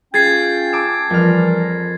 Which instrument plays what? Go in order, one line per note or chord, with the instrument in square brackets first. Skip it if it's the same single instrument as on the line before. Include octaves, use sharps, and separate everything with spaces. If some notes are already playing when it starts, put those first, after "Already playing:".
[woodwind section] C#4 F4 G5 [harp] G#4 [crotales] G#6 A6 C7
[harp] A5 D6 E6
[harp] F2 F6 [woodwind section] E3 G3 A#4